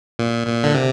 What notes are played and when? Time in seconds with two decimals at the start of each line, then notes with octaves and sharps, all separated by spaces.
0.19 A#2
0.47 A#2
0.64 D3
0.75 C3